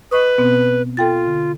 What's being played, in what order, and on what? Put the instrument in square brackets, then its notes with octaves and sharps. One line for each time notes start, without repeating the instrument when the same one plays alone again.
[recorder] B4 [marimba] D#5 C#6 D#6
[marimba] B2 B3 C4
[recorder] F4 [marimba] A4 G5 A6
[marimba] D3